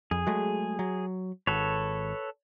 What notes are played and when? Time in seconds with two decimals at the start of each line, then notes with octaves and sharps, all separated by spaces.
0.11 F2 G#4
0.27 F#3 G#3 A3
0.79 F#3
1.47 G#1 A4 B4 C#5